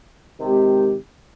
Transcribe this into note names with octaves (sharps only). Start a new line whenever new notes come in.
C3 D#3 G#3 C4 G4